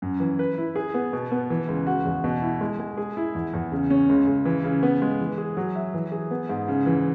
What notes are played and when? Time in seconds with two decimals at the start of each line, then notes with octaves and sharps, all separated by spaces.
0.02 F#2
0.20 E3
0.39 B4
0.58 E4
0.76 G#4
0.94 B3
1.13 B2
1.32 B3
1.50 E3
1.68 C#2
1.87 F#4
2.05 E2
2.24 B2
2.42 E4
2.61 G#3
2.80 G#3
2.97 G#4
3.17 E4
3.35 E2
3.53 E2
3.72 C#3
3.90 C#4
4.09 C#2
4.27 C#2
4.45 E3
4.64 C#3
4.83 B3
5.02 G#3
5.19 E3
5.38 G#4
5.57 F#3
5.75 E5
5.94 E3
6.12 G#4
6.31 B3
6.49 G#2
6.68 C#3
6.86 E3